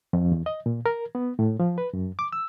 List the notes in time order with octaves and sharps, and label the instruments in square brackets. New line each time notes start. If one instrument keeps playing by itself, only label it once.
[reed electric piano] F2
E2
D#5
A#2
A#4
B3
A2
F3
B4
F#2
D6
E6